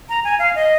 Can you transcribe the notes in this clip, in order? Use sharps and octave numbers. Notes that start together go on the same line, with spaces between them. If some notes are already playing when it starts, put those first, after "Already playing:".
A#5
G#5
F5
D#5